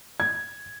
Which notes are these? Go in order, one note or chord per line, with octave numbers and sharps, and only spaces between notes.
G#6